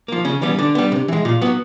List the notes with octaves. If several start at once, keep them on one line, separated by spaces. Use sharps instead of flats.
F3 A#3
C#3 C#4
E3 G3 B3 C#4
D3 D4
G3 B3
C3
E3 G#3
A#2 F4
F#3 B3